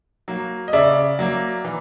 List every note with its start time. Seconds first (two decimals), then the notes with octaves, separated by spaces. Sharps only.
0.28 F#3 A#3
0.68 D#5
0.73 C#3 D5 E5
1.19 F#3 A#3
1.64 E3